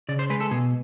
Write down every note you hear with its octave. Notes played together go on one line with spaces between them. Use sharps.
C#3 D5
C5
G#3 B4
A4
B2 G#4